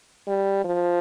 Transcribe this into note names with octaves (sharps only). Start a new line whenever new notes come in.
G3
F3